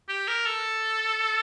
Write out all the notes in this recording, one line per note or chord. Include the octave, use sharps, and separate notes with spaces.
G4
A#4
A4